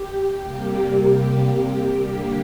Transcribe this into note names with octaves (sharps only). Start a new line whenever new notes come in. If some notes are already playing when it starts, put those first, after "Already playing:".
Already playing: G4
C3 G3 A#3 G4
D3 G3 A#3 G4